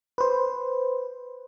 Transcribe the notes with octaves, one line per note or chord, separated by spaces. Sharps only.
B4 C5